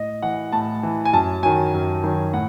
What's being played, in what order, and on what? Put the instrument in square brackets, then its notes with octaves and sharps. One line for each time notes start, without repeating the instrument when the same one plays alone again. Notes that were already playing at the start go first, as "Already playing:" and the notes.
Already playing: [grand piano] A2 D#5
E3 F#5
A2 A5
E3
G#5
F#2 A5
D#3 F#3 G#5
F#2
D#3 F#3
A2 F#5